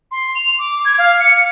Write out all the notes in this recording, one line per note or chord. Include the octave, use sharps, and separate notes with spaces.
C6
F7
D6
G#6
F5
C#7